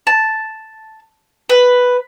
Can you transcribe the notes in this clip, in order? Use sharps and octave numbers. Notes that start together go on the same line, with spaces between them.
A5
B4